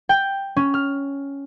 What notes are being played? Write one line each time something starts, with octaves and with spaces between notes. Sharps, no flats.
G5
C#4
F6